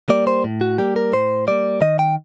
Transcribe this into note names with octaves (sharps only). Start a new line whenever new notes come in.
G3 A#3 D5
C5
A2
F#4
G3 A#3 G4
A#4
A2 C5
G3 A#3 D5
D#3 D#5
G5